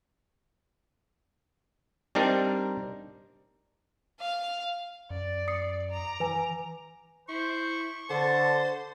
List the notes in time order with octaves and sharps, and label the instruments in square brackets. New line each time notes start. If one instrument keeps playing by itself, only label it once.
[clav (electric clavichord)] G3 C4 D4 D#4 A#4
[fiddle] F5
[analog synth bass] F#2 [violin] D5
[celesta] D#6 C7 C#7
[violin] A#5 D6
[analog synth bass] E3 [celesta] B4 G#5
[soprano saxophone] E4 [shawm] C5 [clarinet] C#6
[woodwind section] D3 [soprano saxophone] C5 [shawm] A5